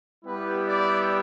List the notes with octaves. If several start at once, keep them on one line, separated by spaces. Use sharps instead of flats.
G3 B3 E4 G4 B4
D5